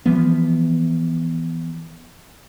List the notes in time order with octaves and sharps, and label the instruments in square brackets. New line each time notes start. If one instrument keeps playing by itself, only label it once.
[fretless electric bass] E3 F3 B3